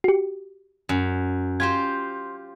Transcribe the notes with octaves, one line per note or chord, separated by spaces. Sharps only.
F#4 G4
F#2
F4 G4 C5 G#6